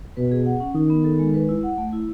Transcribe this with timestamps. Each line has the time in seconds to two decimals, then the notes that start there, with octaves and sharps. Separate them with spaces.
0.17 B2 B4
0.32 G#4
0.46 F#5
0.60 C#4
0.75 D#3 D#4
0.90 B3
1.04 A4
1.19 G#3
1.34 B4
1.49 E4
1.63 F#5
1.78 A3
1.93 E4